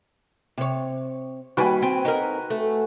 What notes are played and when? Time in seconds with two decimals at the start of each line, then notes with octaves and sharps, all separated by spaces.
0.58 C3 C#5
1.57 D#2 G3 F#4 B4 G#5
1.82 C4
2.05 D#4 A#4
2.50 A3